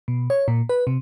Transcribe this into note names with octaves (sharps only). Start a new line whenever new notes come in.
B2
C#5
A#2
B4
C3